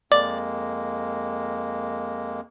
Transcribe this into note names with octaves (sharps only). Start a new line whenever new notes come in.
F2 G#3 A#3 D5